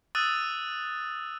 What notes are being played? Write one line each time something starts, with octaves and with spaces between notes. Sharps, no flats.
D#6 E6 F#6 A6 D#7